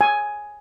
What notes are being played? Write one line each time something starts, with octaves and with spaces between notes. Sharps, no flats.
G#5